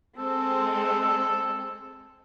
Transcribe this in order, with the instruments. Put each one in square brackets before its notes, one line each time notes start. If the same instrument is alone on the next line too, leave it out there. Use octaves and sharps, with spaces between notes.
[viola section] G#3 C4 [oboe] A4